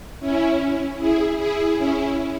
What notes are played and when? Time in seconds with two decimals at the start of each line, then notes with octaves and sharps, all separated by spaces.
0.20 C#4 E4
0.99 E4 G#4
1.38 E4 G#4
1.78 C#4 E4